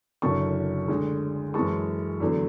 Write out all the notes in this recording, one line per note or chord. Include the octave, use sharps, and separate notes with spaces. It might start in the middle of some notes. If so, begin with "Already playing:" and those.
F#1 F#2 D3 F#3 A5 C#6
D2 D3 G#3
F#2 E3 G#3 A5 C#6
E2 D3 F#3 A3